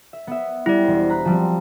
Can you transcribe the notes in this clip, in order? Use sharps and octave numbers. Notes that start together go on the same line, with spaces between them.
E5
B3 E5
G3 E4 D5
E1 C5
A#5 B5 F#6
F3 G3 C4 A5